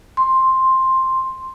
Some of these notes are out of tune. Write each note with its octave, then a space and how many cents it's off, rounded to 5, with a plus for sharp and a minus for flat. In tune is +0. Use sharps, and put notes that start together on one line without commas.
C6 +5